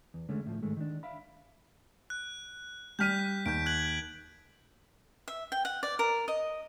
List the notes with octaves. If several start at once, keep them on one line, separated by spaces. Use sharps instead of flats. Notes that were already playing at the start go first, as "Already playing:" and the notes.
E2
D3 G#3 A3 C#4
A2 F3
G#2 D#3 G#3 A3
D#3 D4
E5 F5 B5
F#6
G3 F6 G6 B6 D#7
D#2 G6 D7
F#6 G#6 F#7
E5
G5
F#5
D5
A#4
D#5